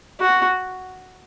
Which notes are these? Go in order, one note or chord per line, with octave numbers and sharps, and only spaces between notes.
F#4